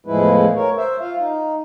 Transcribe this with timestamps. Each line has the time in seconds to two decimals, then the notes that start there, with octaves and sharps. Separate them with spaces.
0.06 E2 A2 F3 G#3 E4 B4
0.56 A#4 C#5
0.77 C5 E5
1.01 F4 F5
1.20 D#4